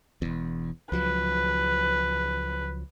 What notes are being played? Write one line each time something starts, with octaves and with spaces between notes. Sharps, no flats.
E1 E2
C#2 F3 F#3 B4